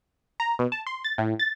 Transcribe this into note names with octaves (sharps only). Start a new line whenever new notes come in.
A#5
B2
A5
C6
A6
A2
A6